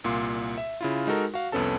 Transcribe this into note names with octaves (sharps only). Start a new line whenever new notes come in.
C2 A#2 F4 C6
E5
C#3 E4 F4
G#3 D#4 F#4 A4 A#4
F#4 F5
C2 F2 B3 C#4 A4 A5